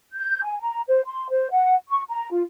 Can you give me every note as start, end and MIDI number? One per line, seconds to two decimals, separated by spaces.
0.14 0.43 91
0.43 0.57 80
0.60 0.82 82
0.88 1.01 72
1.06 1.30 84
1.30 1.48 72
1.51 1.74 78
1.89 2.02 85
2.08 2.28 82
2.32 2.43 65